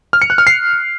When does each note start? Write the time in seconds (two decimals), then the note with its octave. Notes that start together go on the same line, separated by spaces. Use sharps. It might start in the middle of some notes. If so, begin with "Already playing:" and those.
0.13 F6
0.22 C#7
0.30 F#6
0.38 F6
0.47 C7